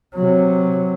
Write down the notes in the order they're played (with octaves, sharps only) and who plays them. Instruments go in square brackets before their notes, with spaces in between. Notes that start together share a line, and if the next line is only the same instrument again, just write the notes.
[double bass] C3 F#3